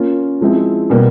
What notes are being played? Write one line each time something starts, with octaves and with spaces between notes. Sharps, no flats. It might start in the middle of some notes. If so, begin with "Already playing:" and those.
Already playing: A#3 C#4 F4
F3 G#3 C4 E4
B2 G3 A#3